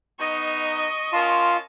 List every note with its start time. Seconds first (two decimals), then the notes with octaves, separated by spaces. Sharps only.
0.19 B3 D#4 D#5 C#6
1.12 C#4 F4 A#4 A5 C6